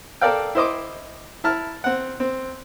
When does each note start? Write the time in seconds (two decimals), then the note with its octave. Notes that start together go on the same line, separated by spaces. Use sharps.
0.21 A4 A#4 D5 F5 G5
0.55 E4 C5 D#5 D6
1.44 E4 A5 F6
1.84 C4 F#5
2.20 C4